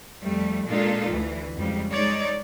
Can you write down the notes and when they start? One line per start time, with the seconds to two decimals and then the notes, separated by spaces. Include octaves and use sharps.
0.21 F2 G3 A3
0.66 A#2 G#3 D4 D#4 F4 A4
1.09 D2 E3
1.55 F2 C#3 G3 G#3
1.90 G#3 D#4 C#5 D5